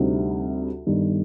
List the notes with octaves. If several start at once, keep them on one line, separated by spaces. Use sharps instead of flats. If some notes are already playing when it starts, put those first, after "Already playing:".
Already playing: D2 C3 G3 C4 D#4
G1 G2 D#3